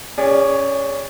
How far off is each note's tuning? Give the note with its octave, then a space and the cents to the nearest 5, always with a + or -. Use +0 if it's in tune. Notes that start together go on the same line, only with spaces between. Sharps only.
C#4 +10 G#4 -35 D5 +0